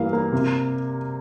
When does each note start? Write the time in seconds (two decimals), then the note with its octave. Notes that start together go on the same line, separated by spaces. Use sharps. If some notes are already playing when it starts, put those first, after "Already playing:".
Already playing: G2 E3 A#3 F5
0.13 A#3
0.32 C3